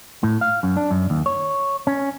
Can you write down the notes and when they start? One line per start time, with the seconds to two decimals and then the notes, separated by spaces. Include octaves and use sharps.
0.23 A2
0.41 F5
0.63 F#2
0.77 D4
0.91 F#2
1.10 D#2
1.26 C#5
1.87 C#4